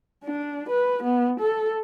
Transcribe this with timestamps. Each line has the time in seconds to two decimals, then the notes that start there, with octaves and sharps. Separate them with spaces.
0.25 D4
0.70 B4
1.03 B3
1.40 A4